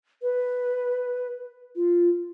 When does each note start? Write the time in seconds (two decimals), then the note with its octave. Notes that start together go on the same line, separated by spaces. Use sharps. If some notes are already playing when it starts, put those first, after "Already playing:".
0.22 B4
1.76 F4